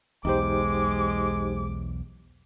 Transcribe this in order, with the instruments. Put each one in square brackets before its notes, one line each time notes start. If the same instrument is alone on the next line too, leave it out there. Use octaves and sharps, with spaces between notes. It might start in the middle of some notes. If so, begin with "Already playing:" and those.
[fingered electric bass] B1 E2 [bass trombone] G#3 [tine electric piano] D#4 G4 C5 [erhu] D6